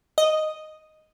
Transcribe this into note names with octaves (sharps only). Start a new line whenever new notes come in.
D#5